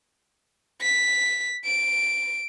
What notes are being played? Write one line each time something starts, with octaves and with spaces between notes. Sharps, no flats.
B6
D7